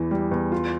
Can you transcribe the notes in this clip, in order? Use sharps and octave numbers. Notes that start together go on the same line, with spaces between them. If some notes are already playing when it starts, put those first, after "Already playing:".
Already playing: E2 E3
G3
E2
F4